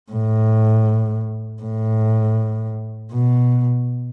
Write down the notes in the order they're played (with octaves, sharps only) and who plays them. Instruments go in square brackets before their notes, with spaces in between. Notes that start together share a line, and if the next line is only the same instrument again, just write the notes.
[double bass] A2
A2
B2